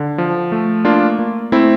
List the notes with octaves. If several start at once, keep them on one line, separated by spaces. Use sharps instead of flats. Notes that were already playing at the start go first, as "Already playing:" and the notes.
Already playing: D3
F3
A3
A#3 D4 F4
A#3
A3 C4 E4